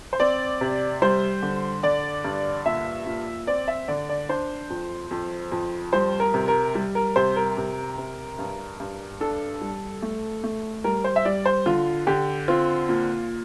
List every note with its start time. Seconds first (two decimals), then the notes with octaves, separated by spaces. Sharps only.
0.13 C5
0.20 C4 D5
0.61 C3
1.02 G3 C5
1.42 D3
1.83 D3 D5
2.25 G2
2.65 A#2 E5
3.06 A#2
3.47 C4 D5
3.68 E5
3.88 D3 D5
4.09 D5
4.29 D4 C5
4.70 F2
5.11 F2
5.52 F2
5.93 G3 C5
6.20 A#4
6.34 C3
6.48 A#4
6.75 G3
6.95 A#4
7.16 C3 C5
7.36 A#4
7.57 C3
7.98 C3
8.39 G2
8.80 G2
9.20 D4 A4
9.61 G3
10.02 A3
10.44 A3
10.84 G3 A#4
11.04 C5
11.16 E5
11.25 G3 D5
11.46 C5
11.66 D3 F4
12.07 D3 G4
12.48 C4 F4
12.89 A#2